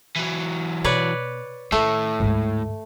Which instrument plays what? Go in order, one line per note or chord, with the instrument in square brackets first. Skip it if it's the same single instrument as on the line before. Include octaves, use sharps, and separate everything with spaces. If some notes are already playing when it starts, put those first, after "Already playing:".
[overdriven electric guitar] E3 F#3
[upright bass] B2 [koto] B4 C#5 D5
[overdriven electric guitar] A2 [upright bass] D#3 C#4 [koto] A3
[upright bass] D2 G#2